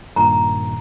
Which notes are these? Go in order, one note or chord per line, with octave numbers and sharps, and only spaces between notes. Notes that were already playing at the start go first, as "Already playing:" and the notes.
G2 A#2 D#3 A#5